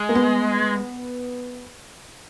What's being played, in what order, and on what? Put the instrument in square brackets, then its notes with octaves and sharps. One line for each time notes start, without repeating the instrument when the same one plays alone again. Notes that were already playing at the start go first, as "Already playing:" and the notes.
Already playing: [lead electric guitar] G#3
[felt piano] A#3
B3